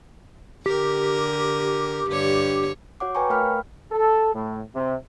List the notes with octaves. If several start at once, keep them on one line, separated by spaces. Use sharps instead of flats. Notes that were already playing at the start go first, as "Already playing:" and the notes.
D3 G4 A#4
G2 D3 C#5
F#4 C#5 F#5 D6
B4 C#5 G5 G#5 A#5 C#6
A3 A#4 F5 G5 B5 F6
A4
A2
C3